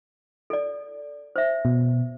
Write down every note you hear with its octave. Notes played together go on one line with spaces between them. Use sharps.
A4 D5
C5 E5
B2